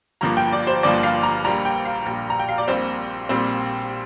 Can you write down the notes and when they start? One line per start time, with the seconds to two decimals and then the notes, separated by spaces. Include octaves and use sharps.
0.21 G1 G2 F3 A#3 A#5
0.37 G5
0.53 D5
0.67 C5
0.83 G1 G2 F3 A#3 D5
1.03 F5
1.23 A#5
1.44 A#1 A#2 G3 A#5
1.65 G5
1.85 F5
2.06 A#1 A#2 G3
2.30 A#5
2.40 G5
2.49 F5
2.58 D5
2.68 A#1 A#2 G3 C4 C5
3.29 A#1 A#2 G3 C4